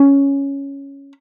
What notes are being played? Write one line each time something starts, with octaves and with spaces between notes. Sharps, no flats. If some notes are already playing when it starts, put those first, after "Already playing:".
Already playing: C#4